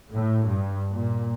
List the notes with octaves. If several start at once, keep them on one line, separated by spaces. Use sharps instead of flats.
A2
G2
A#2